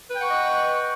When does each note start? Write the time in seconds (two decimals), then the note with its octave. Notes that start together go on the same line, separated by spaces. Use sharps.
0.10 B4
0.15 G5
0.19 F#5
0.24 C#6
0.28 D#5